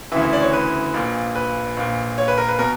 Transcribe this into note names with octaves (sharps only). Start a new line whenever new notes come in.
D2 C#3 E3 E5
E5
D5
C#5
B4
A#1 A#2
B4
A#1 A#2
C#5
B4
A#4
B4
B2 A#4